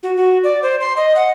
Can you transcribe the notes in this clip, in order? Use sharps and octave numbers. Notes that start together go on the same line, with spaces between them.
F#4
F#4
D5
C5
C6
D#5
F#5